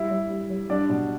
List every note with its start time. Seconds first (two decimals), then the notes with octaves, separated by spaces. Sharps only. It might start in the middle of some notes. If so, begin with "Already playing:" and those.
Already playing: G3 E4 E5
0.11 G3
0.30 G3
0.50 G3
0.69 G3 D4 D5
0.90 B2